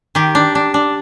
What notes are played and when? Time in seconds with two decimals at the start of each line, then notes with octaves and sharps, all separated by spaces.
0.15 D#3 G4
0.35 D4
0.55 D4
0.74 D4